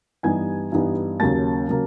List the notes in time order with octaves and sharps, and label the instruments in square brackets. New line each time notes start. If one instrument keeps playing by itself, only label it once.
[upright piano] G2 E3 G3 B3 D#4 G#5 G#6
G2 E3 G3 B3 D#4
D#2 C#3 F#3 A#3 A5 A6
C#3 F#3 A#3